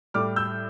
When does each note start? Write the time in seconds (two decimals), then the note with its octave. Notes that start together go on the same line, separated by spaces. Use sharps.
0.14 A2 G3 D6 F6
0.36 E6 G6